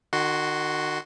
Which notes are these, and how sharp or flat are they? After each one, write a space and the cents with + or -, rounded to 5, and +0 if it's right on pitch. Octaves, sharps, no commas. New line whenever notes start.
D#3 -35 F#4 +0 C6 +0